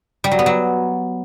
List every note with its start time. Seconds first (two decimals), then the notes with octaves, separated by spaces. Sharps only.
0.24 G3
0.31 F#3
0.39 B3
0.46 F#3